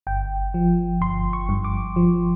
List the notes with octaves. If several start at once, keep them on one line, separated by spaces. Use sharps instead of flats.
G1 G5
F3
G1 C6
C#6
G2
D6
F3